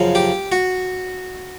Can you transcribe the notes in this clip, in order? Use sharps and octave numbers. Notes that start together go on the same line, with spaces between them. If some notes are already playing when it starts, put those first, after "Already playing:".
Already playing: F#2 C#3 F3
G4
F#4